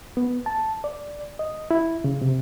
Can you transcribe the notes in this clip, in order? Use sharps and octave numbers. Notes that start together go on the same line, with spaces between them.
B3
A5
D5
D#5
E4
C#3
C3